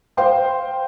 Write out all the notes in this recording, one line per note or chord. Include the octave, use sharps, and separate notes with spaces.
C5 F5 G5 C6